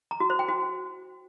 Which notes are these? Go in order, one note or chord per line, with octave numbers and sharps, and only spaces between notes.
A#5
F#4
C5
G5
F#4